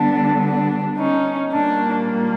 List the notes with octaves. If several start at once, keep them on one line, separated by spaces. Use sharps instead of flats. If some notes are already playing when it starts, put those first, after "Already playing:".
Already playing: D3 G3 B3 D4
D4
C#4 D#4
A#2 G3 A#3 D4